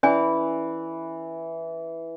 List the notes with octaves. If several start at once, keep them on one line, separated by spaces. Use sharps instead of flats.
E3 C#4 D5 G#5